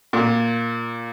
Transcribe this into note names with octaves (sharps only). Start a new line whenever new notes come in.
A#2